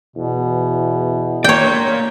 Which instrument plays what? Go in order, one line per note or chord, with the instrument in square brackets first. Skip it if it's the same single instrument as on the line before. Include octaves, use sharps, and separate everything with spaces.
[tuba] E2 [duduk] B2
[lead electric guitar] A#3 D5 [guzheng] C#5 G5